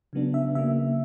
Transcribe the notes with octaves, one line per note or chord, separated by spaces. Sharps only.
C#3 F#3 B3 D4
E5
C#3 F#3 A#3 E5